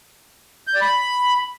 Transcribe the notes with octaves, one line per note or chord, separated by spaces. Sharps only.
G6
D5
B5